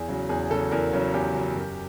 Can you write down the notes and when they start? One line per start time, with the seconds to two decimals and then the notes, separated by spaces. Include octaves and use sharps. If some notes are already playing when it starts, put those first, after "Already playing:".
Already playing: E2 G#4
0.08 C#3 F#3
0.29 E2 G#4
0.50 C#3 F#3 A4
0.71 E2 A#4
0.93 C#3 F#3
1.14 E2 G4
1.35 C#3 F#3
1.56 F#2